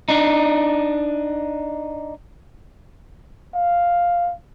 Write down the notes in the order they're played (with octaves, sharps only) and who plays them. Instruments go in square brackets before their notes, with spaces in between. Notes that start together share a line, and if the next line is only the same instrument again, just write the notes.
[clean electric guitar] D4 D#4
[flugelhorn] F5